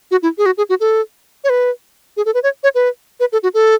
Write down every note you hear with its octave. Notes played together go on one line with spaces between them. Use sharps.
F#4
E4
G#4
F#4
G#4
F#4
A4
C#5
B4
G#4
A4
B4
C#5
C#5
B4
B4
A4
F#4
A4